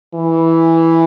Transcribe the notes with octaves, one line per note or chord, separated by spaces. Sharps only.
E3